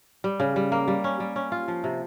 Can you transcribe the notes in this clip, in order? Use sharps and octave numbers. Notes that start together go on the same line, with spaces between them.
G3
C#3
G3
A#3
G3
C#4
G3
C#4
F4
F3
C3